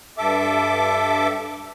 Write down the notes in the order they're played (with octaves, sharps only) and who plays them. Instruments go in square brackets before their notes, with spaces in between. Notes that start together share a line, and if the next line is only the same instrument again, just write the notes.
[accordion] G2 A4 E5 D6